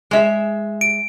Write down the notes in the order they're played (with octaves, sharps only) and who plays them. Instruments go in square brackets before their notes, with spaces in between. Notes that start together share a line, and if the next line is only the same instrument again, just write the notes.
[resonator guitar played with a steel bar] G#3 E5
[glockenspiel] D7